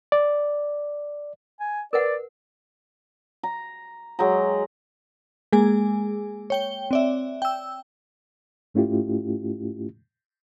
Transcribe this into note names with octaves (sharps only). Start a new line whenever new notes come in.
D5
G#5
A#4 B4 D5 F#5
A#5
F#3 G#3 G5 A#5
G#3 A#3 G#4 G#5
C#5 G5 G7
C4 D5 E5
G5 E6
G#2 A3 C#4 E4 F4 G4